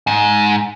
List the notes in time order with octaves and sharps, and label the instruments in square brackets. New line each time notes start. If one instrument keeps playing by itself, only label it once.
[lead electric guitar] G#2